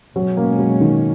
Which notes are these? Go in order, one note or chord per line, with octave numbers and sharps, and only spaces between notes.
B2 F#3 G#3 C#4
A#3
F#3
D#3